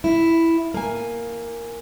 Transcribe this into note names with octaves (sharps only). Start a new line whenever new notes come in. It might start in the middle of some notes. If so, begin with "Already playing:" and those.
E4
A#3 G#5